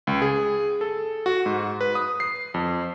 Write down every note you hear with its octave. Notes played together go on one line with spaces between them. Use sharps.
C#2
G#4
A4
F#4
G#2
B4
D#6
C7
F2